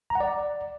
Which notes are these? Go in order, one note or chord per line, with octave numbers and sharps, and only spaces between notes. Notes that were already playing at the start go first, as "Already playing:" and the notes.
A#5
F#5
D5